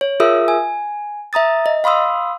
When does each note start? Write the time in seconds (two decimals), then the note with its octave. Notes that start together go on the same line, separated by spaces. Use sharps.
0.01 C#5
0.20 F4 G#4 A#4 E5 D#6 E6
0.48 G#5
1.33 E5 A#5 D#6 A6
1.66 D#5
1.84 F5 B5 C6 D#6 E6